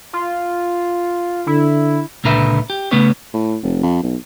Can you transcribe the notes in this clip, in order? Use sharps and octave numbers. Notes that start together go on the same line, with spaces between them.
F4
D3 E4
C#2 A#2 D3 A#4 B4 E5
G4
C#3 A3 B3 C#4 B4 C#5
A2
F1
F2
B1